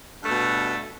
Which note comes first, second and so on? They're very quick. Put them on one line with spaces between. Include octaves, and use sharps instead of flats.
G2 A3 B2